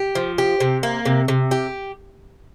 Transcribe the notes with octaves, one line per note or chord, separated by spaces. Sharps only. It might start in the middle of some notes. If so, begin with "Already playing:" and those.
Already playing: G4
F3
G4
C3
A#3
C3
C3
G4